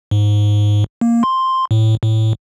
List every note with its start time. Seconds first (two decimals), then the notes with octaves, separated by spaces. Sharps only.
0.11 G#2
1.01 A#3
1.23 C6
1.71 A2
2.03 A2